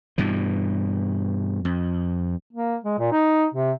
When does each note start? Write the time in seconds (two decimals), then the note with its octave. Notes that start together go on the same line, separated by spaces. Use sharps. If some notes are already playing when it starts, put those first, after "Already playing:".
0.18 G2 B2 E3
1.65 F2
2.53 A#3
2.84 G#3
2.99 A#2
3.12 D#4
3.54 C3